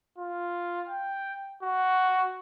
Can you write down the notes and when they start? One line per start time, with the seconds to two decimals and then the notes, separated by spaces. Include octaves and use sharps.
0.18 F4
0.89 G5
1.63 F#4